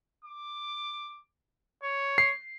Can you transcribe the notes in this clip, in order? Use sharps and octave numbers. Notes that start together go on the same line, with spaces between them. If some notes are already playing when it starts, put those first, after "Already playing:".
D6
C#5
C7